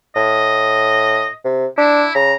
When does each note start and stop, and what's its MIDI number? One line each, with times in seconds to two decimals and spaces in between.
0.16 1.26 45
0.16 1.33 75
1.44 1.66 48
1.78 2.06 62
1.78 2.13 64
2.15 2.34 49
2.15 2.35 82